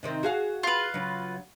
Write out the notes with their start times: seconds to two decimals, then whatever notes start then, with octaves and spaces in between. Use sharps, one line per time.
0.03 C3 D#3 C4
0.23 F#4 G#4 F5
0.63 F4 B4
0.94 C#3 F#3